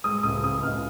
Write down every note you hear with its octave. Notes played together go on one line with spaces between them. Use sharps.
G#3 D#6
C#2 D#6
C#3 D#6
C#2 F6